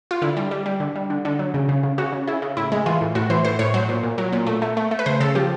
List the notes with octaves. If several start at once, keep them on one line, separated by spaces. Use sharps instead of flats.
F4
D3 E4
G3
G3
G3
D3
G3
D3
D3
F#3
C#3
C#3
C#3
C#3 F#4
C#3
C#3 E4
C#3
A2 E4
G#3
E3 F4
A2
A2 F#4
E3 C5
A2 C5
A2 C#5
F#3 C5
A#2
A#2
F#3
A#2
A3
A3
A3
A3
B4
C#3 C5
C#3 A4
F3 G4